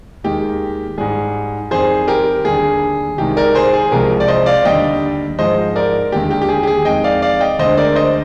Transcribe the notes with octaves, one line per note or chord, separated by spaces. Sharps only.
D#2 D#3 G#3 G4
G#2 G3 G#4
F2 D#3 G3 G#4 C5
G4 A#4
D#2 D3 G3 G#4
C2 C3 D#3 G#3 G4
A#4 D5
G#4 C5
G#4
C2 C3 F3 G#3 G4 A#4
D5
C5 D#5
D5 F5
D#2 D3 G3 D#5 G5
G#2 F3 G#3 C5 D#5
A#4 D5
D#2 D3 G#3 G4
G4
G4
G#4
G4
G#4
F2 D#3 G#3 D#5 G5
D5 F5
D5 F5
D#5 G5
D2 D3 G#3 C5 D#5
A#4 D5
C5 D#5